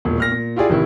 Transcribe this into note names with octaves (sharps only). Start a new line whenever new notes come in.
E1 A#2
A#2 F6 A#6
A#2
E4 F4 G4 G#4 D5
A1 C3 D#3 E4